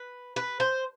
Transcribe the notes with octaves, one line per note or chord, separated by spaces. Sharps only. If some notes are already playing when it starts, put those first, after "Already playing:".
Already playing: B4
B4
C5